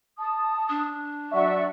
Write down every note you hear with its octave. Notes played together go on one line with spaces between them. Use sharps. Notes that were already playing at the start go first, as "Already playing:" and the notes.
A5 D#6
D4
F#3 D5 E5 F#5 C#6